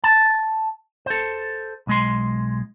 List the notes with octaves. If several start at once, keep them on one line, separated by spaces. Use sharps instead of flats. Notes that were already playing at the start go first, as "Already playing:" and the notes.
A5
A4 C5
B1 G#3 C6